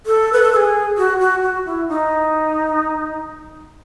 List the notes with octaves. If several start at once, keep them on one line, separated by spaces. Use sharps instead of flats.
A4
B4
A4
A4
G#4
F#4
F#4
F#4
E4
D#4